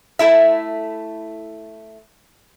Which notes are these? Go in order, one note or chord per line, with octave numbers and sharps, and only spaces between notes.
A3 E4 E5